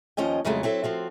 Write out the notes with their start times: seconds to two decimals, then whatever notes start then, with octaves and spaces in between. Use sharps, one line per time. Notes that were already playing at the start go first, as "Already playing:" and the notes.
0.17 D#2 F3 C#4 D#5 G5
0.45 F2 C#3 F#3 G#3 A3
0.63 F#3 C4 E4 A4
0.84 F3 C4 F#4